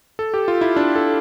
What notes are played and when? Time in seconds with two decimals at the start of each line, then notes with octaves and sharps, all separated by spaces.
0.19 A4
0.34 G4
0.48 F4
0.61 E4
0.76 D4
0.95 A4